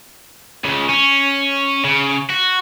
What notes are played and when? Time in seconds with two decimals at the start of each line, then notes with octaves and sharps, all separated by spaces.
0.64 C#2 C#3
0.89 C#4
1.84 C#3
2.30 F#4